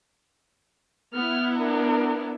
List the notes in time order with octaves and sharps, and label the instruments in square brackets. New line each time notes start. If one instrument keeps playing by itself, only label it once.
[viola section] B3 E4 [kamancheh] F6
[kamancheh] D4 A#4